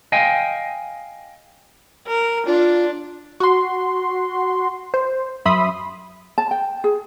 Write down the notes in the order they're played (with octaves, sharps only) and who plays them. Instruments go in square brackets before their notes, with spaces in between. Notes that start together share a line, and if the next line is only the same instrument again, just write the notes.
[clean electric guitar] D#5 F5 G5 G#5
[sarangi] A#4
[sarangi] D4 [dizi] F4
[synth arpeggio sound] F#4 C6
C5
F#2 E5 B5 C6 D#6
[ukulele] A5
G5
G#4